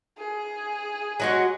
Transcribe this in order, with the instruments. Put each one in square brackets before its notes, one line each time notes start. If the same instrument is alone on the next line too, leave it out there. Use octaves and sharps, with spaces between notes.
[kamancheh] G#4
[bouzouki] F#3 G#3 F#4